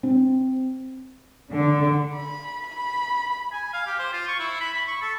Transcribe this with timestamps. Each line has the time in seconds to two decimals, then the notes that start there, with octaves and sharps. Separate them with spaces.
0.03 C4
1.50 D3
2.15 B5
2.67 B5
3.52 G#5
3.73 F5
3.87 G4
3.99 C5
4.13 F4
4.28 C#6
4.39 E4
4.61 B5
4.74 B5
4.87 C#6
5.02 A4